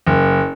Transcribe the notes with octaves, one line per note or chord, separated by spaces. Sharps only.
F#1